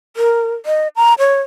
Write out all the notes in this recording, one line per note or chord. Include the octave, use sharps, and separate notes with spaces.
A#4
D#5
A#5
C#5